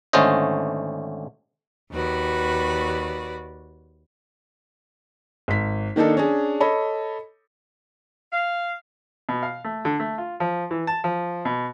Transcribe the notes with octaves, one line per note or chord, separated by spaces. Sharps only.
G#1 D3 A3 C#4 C5 D#5
D#2 F#4 B4 D5
G#1 B6
D#3 A#3 D4 D#4 A4
C#4 D4 G#4
A4 C#5 D#5 B5
F5
B2
F5
A3
D3
A3
F4
F3
E3
A5
F3
B2